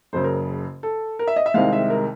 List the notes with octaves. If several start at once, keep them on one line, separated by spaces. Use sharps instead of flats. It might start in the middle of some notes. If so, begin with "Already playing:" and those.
F#1 F#2 C#3 C5
A#4
A4
A#4
E5
D#5
E5
C2 C3 D#3 G#3 F5
E5
A#4